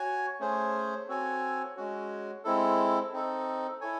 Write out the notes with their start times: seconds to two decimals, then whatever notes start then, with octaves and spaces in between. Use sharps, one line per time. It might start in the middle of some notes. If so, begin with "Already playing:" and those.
Already playing: F#4 C#5 G#5
0.40 A3 C#4 G#4 C5
1.08 C4 F#4 A4 C#5 G#5
1.76 G#3 C#4 F#4
2.44 G#3 C4 E4 A4
3.13 C4 D#4 A4
3.81 E4 A4 C#5 G#5